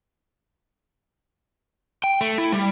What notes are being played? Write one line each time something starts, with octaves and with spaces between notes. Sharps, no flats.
G5
A3
E4
G3